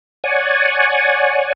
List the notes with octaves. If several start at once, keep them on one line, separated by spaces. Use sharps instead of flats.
C#5 D5 F#5 G#5